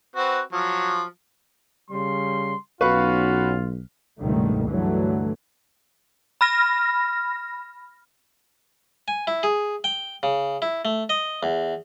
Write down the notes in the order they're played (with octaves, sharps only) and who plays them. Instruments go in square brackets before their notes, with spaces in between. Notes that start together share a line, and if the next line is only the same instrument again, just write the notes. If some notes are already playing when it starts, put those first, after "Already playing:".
[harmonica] C4 F#4 B4
F3 F#3
[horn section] C#3 G3 [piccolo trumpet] C6
[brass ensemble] B1 [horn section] C#4 F#4 [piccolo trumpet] F4 [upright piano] B4 F5 C#6
[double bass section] C#2 G2 B2 D3 D#3 A3
G2 D3 E3 F#3 A3
[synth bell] B5 F6 A#6
[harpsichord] G#5
E4
G#4
G5
C#3
E4
A3
D#5
E2